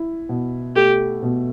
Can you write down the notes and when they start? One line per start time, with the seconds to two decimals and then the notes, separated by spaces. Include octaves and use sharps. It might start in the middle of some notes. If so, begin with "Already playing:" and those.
Already playing: E4
0.29 B2
0.76 A3 G4
1.23 B2